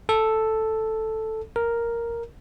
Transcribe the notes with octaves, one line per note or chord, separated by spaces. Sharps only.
A4
A#4